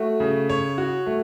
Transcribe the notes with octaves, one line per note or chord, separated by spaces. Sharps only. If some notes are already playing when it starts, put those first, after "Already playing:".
Already playing: A3 F#4
C#3
C#5
F#4
A3